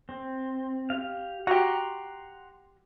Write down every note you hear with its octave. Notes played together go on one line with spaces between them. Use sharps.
C4
G4 F5
F#4 G4 F#5 A#5 C6